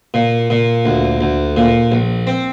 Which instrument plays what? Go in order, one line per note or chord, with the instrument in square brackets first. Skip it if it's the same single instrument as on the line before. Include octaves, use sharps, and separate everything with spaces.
[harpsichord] A#2
A#2
D2
D2
A#2
A#1
C4